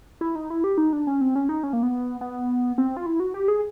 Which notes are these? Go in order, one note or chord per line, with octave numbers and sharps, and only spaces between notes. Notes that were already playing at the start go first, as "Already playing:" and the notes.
E4
D#4
E4
G4
D#4
D4
C#4
C4
C#4
D#4
C#4
A#3
B3
B3
C4
F4
E4
F#4
G4
G#4